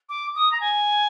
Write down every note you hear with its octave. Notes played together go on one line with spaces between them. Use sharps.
D6
D#6
A#5
G#5